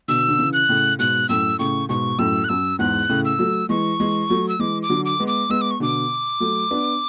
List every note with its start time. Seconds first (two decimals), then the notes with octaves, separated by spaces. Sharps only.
0.08 B2 D3 E6
0.28 D3
0.38 C#3 E3
0.53 F#6
0.69 A2 C#3
0.99 G#2 B2 F#6
1.29 F#2 A2 E6
1.59 A2 C#3 C#6
1.89 G#2 B2 C#6
2.19 F#2 A2 E6
2.44 F#6
2.49 F#2 E6
2.79 E2 G#2 F#6
3.09 A2 C#3
3.25 E6
3.39 F#3 A3
3.69 E3 G#3 C#6
4.00 E3 G#3
4.30 F#3 A3
4.49 E6
4.59 E3 G#3 D6
4.82 D6
4.89 D3 F#3
5.05 D6
5.20 G#3 B3
5.27 D6
5.50 G#3 B3 E6
5.61 D6
5.71 C#6
5.80 B2 D3 D6
6.40 F#3 A3
6.71 B3 D4